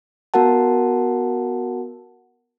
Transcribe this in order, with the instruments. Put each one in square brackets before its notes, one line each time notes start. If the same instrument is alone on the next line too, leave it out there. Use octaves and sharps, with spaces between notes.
[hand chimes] B3 F#4 A#4 F#5 A5